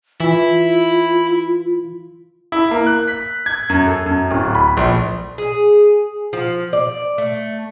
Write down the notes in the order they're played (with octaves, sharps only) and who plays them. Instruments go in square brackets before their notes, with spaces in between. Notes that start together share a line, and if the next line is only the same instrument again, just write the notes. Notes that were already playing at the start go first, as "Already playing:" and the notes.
[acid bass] E3 [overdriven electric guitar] E4 [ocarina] F4
[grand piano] E4
A#3
F#6
B6
G#6
F#2
A4
F#2
D1
B5
A#1
[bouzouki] G#4
F3
D5
A3